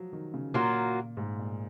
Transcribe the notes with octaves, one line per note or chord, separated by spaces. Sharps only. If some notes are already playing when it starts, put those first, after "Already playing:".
Already playing: F3 F#3
D#3
C#3
A#2 F#3 A#3 F4
G#2
A#2